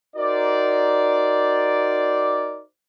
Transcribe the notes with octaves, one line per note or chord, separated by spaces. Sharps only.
D#4 F#4 A#4 C5 D5